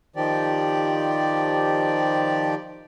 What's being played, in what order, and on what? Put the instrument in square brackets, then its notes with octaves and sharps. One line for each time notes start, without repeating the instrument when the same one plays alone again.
[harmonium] D#3 F3 G4 D5